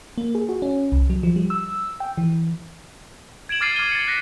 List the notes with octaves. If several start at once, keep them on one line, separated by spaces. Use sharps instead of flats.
A#3
G#4
F#4
C#4
C2
F#3
F3
G3
E6
G5
E3
G#6 D7 E7 F#7
D6 F6 A6 C7 D#7
D6 F6 A6 D#7 G7
A6 C#7
F#6 A#6 B6 C#7